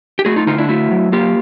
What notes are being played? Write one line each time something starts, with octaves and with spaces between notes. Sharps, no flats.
G4
A3 F#4 G#4
D#4 F4
D3 D#4 F4
D4 E4
A3 E4 F#4
F#3
A#3 F4 G4